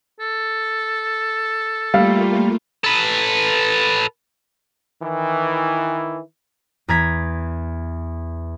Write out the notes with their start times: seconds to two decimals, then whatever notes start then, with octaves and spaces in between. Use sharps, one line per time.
0.20 A4
1.94 G3 A3 A#3 F4 F5
2.84 A4 B4
5.02 D#3 E3
6.88 E2 A#5 G#6 B6